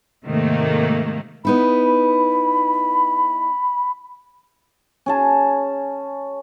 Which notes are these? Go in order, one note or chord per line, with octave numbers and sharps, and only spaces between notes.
G#2 C3 D#3 A3 A#3
B3 D#4 E4 B5
C#4 G#4 A5